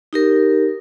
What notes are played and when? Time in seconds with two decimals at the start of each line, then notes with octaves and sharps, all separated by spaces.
0.13 D#4 G4 A#4